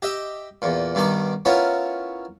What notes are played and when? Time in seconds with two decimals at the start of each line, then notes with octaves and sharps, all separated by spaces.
0.02 G4 D#5 E5
0.62 E2 A#2
0.95 G2 B2 D#3 D#4 D6
1.45 B3 C#4 E4 F4 A#4 C#5